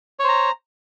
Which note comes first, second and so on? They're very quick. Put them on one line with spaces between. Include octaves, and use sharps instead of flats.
C#5 C5 A#5